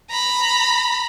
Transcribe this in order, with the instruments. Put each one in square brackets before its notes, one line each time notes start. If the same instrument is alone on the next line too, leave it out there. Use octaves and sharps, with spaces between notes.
[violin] A#5 B5